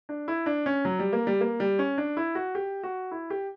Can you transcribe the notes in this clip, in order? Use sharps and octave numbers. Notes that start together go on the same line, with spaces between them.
D4
E4
D4
C#4
F#3
G3
A#3
G3
A#3
G3
C#4
D4
E4
F#4
G4
F#4
E4
G4